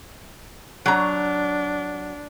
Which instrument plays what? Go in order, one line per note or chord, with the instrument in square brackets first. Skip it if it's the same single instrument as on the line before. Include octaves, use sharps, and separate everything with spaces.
[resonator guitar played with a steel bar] F#3 A#5 [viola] D4